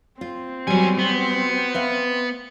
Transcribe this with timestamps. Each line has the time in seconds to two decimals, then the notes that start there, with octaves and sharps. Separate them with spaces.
0.21 C4 F4
0.67 F#3 G3 B3 G#5
0.99 B3
1.74 B4 E5 F5